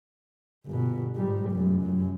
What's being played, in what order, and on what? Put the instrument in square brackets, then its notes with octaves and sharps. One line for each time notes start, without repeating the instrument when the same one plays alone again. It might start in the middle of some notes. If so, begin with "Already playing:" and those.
[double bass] G1 B2
G#2 G3
F1 F#2
F#2